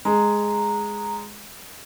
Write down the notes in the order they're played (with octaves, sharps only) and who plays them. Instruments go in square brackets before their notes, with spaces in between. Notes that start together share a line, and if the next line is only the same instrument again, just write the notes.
[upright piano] G#3 [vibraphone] A#5